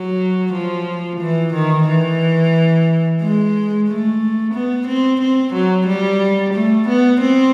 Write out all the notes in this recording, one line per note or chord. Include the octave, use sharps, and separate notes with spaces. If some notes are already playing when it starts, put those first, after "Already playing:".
Already playing: F#3
F3
E3
D#3
E3
G#3
A3
B3
C4
C4
F#3
G3
A3
B3
C4